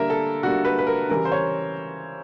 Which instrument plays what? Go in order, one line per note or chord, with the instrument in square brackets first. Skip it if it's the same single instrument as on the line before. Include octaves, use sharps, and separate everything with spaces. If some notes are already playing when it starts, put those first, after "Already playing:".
Already playing: [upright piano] D3 G3 A#3 A#4 E5
A4
D3 G3 A#3 F#4
B4
B4
A#4
C#3 E3 G3 A#4
C5
C#5